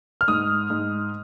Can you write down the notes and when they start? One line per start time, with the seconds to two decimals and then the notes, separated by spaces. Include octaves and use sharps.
0.21 F6
0.28 G#2 D#6
0.70 G#2